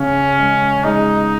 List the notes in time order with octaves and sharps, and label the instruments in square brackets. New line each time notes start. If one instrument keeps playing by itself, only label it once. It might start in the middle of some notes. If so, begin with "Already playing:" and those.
Already playing: [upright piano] C#3 [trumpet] C#4
[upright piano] G#3
[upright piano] G#3 [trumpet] D#4